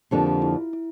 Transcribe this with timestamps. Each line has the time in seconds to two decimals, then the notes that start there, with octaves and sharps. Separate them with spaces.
0.11 F2 D3 F3 A#3 D4 G4
0.27 F4
0.42 E4
0.73 E4